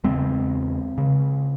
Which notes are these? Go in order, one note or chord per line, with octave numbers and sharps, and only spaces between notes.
E2 C#3 G#3 C4
C#3